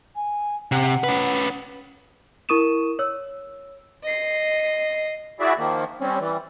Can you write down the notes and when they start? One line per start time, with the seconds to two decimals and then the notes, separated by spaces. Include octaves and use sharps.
0.15 G#5
0.72 C3 F#5
1.04 C#4 B4
2.49 E4 A#4 C#6 D#6 D#7 E7
2.99 C#5 E6
4.03 D#5 C7
5.40 E4 F#4 G#4 D5 E5
5.58 D#3 F3 A#3
6.01 G3 C4 C#4
6.20 E3 G3